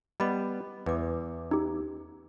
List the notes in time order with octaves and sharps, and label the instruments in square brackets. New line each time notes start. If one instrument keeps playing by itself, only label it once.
[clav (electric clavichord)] G3 B3 [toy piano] D#5 B5 D6
[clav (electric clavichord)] E2 [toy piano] B4 D6
[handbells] D#4 G4